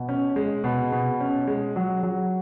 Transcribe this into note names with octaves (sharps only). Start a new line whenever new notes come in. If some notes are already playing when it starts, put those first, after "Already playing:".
Already playing: B2
C#4
G#3
B2
B2
C#4
G#3
F#3
F#3